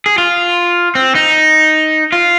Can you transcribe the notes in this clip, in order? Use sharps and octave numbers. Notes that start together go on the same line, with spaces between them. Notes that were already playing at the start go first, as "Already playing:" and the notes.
G#4
F4
C4
D#4
F4